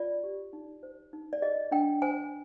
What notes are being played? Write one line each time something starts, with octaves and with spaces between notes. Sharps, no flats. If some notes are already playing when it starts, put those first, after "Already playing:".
Already playing: F4 D5
G4
D#4
C5
D#4
D5
G#4 D#5
D4 G5
C5 G#5